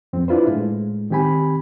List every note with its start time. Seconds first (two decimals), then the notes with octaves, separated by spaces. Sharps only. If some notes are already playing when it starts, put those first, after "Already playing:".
0.13 F2 C4
0.28 D4 E4 F4 B4 C5
0.47 A2 G#3
1.10 D#3 C4 G4 G#5 B5